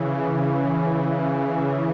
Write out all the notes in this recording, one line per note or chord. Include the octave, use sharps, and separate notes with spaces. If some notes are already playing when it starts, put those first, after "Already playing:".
Already playing: C#3 E3